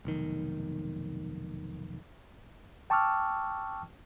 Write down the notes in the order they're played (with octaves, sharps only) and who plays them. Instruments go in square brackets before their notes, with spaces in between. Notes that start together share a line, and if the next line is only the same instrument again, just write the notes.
[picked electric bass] F1 B1 D#3
[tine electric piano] G5 A5 C#6 D6 E6 F6